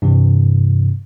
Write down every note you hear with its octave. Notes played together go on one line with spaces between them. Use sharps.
G2 C3 E3